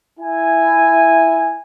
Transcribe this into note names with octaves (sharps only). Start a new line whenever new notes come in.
E4 G#5